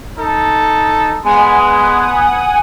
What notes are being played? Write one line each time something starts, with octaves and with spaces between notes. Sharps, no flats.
D#4 A4
G#3 B3 F#5 G#5 D#6